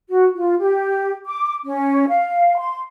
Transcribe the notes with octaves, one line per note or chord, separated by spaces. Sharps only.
F#4
F4
G4
D6
C#4
F5
C6